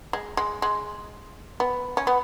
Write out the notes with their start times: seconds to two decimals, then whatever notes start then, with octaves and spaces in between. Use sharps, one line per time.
0.13 G#3
0.37 G#3
0.62 G#3
1.60 B3
1.97 C#4
2.07 B3